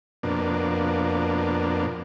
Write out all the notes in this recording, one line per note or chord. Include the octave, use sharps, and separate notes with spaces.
F2 B2 A#3 D4